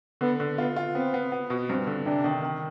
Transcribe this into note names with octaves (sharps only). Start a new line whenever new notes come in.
D3 B3
D3
B3 F4
F4
B3 C4
B3
B3
B2
G2 C4
D3
C3 D4
D#3
D#3